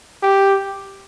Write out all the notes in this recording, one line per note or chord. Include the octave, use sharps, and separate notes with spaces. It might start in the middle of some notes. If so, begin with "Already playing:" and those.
G4